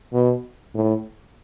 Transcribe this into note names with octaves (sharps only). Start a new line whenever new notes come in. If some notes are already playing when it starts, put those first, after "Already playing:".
B2
A2